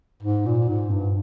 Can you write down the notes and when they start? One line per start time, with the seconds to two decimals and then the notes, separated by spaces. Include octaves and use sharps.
0.22 G#2
0.46 A#2
0.68 G#2
0.90 G2